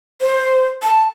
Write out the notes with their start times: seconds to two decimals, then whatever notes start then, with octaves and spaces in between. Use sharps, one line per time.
0.21 C5
0.83 A5